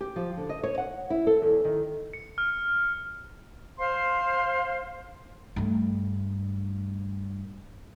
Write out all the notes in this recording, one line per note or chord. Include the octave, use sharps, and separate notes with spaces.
G4
F3
D3
D#5
C#5
F#5
E4
A4
E2
D#3
C#7
F6
C5 F5 C6
G2 A3